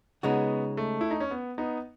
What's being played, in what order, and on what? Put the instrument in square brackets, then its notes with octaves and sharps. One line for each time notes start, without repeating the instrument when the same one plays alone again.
[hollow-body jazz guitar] C#3 G#3 D#4 F#4 [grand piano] B3
[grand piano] A3
E4
D#4
C#4
B3
B3 D#4